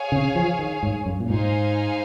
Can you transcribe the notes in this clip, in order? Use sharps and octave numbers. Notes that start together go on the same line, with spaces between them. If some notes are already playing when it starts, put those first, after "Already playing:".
Already playing: G#4 C#5 F5 G#5
C#3
F3
D#3
G#2
F#2
A#2
G#2 D#4 G#4 C5 F5 G#5